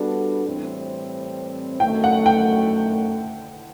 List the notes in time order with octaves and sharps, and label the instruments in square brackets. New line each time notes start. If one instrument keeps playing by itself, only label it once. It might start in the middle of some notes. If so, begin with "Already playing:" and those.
Already playing: [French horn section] G3 B3 D4 F#4 A4
A2 E3 G3 C4
[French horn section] F#2 D#3 F#3 A3 [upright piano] G5
[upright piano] F#5
G5